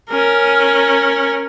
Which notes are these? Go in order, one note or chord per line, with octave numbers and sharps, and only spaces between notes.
C#4 A#4